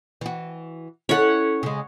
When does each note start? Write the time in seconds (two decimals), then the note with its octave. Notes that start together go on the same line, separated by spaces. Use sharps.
0.21 E3 F#4
1.09 C#4 E4 A4 C#5 F#5
1.63 C#3 G#3